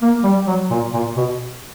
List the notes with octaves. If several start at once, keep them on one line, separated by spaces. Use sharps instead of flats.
A#3
G3
F#3
A#2
A#2
B2